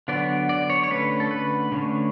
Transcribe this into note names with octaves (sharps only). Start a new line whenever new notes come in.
D3 F#3 B3 D5
D5
C#5
C#5
D3 A3 C#4 B4
A4
B4
D3 A3 C#4